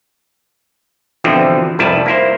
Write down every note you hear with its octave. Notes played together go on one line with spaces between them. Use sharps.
E2 B2 D3 E3 F3 C4
C2 F2 G3 E4 B4 A5
A#3 E4 C5